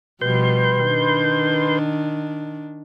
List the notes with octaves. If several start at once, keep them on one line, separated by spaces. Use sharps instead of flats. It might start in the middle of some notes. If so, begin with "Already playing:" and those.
B2 F3 G3 B4 C6 G6
D#3 D4